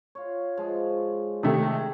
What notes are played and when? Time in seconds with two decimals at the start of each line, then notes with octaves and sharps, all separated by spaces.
0.15 F4 C#5
0.57 F3 G#3
1.43 C3 D#3 A3 G#4 E5